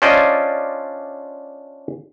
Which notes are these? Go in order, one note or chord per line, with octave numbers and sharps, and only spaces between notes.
C#4 D4 F4 C5 D5 D#5